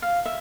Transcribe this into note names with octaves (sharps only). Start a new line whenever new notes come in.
F5
E5